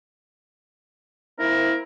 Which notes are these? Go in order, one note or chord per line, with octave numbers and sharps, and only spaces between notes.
A#3 C4 E4 A#4